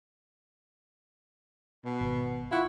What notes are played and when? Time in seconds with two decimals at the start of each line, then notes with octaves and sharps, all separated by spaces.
1.85 B2
2.01 G#1
2.51 E4 F4 F#5 C#6